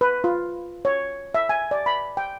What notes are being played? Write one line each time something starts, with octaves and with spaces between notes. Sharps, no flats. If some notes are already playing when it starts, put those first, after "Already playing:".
B4
F4
C#5
E5
G#5
D5
B5
G5